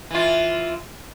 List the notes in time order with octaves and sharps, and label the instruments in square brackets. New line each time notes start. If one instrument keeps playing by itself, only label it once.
[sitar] E3 F4